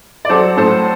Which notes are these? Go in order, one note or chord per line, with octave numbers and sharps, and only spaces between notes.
D5
F#3 A4 C5
A2 A4 C5